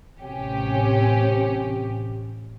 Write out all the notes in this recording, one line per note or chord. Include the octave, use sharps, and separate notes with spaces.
A1 C3 C#4 G4